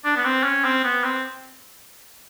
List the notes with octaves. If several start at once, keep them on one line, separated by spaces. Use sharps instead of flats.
D4
B3
C4
C#4
C4
B3
C4